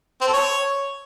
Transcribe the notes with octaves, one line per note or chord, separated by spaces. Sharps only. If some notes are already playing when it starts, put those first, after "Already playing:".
C4
A4
C#5